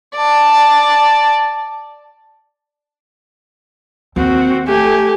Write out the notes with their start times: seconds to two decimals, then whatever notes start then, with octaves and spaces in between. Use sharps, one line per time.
0.15 D5 A5
4.16 D#2 C4 F#4
4.69 A3 G4 G#5